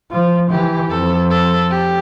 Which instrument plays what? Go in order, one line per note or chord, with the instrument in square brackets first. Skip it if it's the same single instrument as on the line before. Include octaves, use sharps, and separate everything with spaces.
[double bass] F3 [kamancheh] F4
[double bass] E3 [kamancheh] G4
[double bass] F2 [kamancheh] A4
[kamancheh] A4
G4